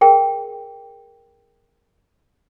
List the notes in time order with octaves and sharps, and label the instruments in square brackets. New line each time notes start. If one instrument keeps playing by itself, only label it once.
[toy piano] G#4 A#4 G5